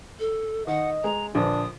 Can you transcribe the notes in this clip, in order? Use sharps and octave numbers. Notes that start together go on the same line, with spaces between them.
A4
D#3 D#5 F#5
G#3 A#5
A#1 D3 D4 D#6